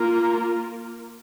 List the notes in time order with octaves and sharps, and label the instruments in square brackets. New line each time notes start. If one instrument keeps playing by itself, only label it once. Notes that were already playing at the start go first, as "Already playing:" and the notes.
Already playing: [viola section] A#3 F4 A#4